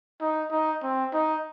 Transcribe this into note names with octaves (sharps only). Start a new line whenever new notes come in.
D#4
D#4
C4
D#4